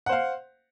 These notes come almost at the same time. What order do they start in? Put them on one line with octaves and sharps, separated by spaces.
F#5 C5 F5